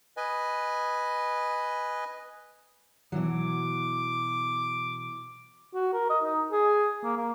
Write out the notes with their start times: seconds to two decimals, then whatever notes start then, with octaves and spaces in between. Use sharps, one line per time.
0.17 B4 D#5 G#5
3.12 B2 E3 F#3 D6
5.74 F#4
5.93 A#4
6.10 D#5
6.24 D#4
6.52 G#4
7.03 A#3
7.17 A#3